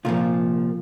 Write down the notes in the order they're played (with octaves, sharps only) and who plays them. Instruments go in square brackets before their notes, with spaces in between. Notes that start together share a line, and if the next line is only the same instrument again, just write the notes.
[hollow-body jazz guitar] C2 A#2 F3 F4